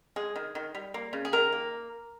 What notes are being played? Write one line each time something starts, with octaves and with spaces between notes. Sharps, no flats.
G#3 G#4
D#3
D#3
G3
A#3
C#3
G#4
D#3 A#4
A#3